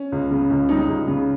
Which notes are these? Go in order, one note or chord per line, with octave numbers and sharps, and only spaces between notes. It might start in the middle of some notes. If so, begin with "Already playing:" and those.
Already playing: C#4
C#2
C#3
C#2
G3 D#4
C#2
C#3